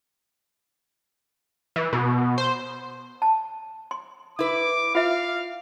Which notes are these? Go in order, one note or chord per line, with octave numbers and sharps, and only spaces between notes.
E3
B2
C5
A5
C6
E4 B4 D6
F4 E5 F5